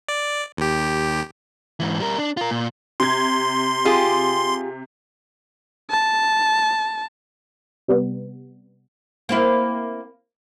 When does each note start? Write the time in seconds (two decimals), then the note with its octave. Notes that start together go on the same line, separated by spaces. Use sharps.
0.08 D5
0.57 D#2 G4
1.80 G#2 E3
2.00 G3 A#4
2.18 D4
2.37 F4 A#4
2.51 A#2
3.00 C3 C6 G#6
3.85 F4 G4 G#4
5.90 A5
7.88 C3 G3 B3
9.29 A#3 C4 E4